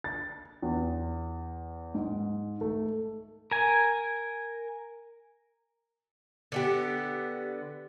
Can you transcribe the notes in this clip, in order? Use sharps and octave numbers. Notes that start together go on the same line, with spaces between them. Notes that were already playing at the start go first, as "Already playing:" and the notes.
A6
E2
G#2
A3
A#4 G#5
D3 B3 G4